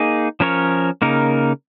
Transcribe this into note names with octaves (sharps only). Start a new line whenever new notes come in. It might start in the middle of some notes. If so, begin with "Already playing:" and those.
Already playing: A#3 D#4 G#4
F3 C#4 A#4 C#5
C#3 A#3 D#4 A#4